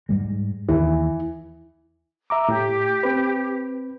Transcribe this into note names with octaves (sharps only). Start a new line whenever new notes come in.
G#2 G3 G#3
D#2 E3
E5 A#5 D6
A2 G4
C4 B4